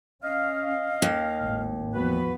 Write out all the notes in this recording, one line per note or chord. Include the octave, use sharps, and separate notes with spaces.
C#4 D#5 F5
D#2
G#1 A2
E2 F3 B3 F#4 B4